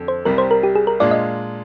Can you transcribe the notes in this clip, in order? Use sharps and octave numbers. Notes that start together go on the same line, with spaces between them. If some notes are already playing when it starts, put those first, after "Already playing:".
Already playing: F2 D3
C5
C2 C3 G3 A#4
C5
A#4
G4
G#4
A#4
A#2 G#3 D4 F4 D5
D#5